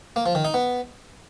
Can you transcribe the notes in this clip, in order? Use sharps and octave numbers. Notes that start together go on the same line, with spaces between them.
A#3
F3
D#3
D#4
B3